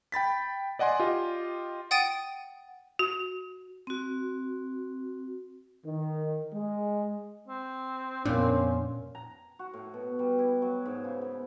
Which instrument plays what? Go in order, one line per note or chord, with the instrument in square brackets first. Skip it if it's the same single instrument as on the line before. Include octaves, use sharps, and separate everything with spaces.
[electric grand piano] G5 B5 A6 B6
D5 D#5 F#5 G#5 C6
F4 G4 D#5
[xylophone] F#5 G5 D#6 A6 D7 D#7
[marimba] F#4
[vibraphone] C4 F#4
[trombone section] D#3
G#3
[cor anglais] C4
[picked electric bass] F2 B3 D4 [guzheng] A#2 [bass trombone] C#4
[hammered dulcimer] A#5
F#4
A2
B2
G3
E4
F#3
G#2
C#3
B3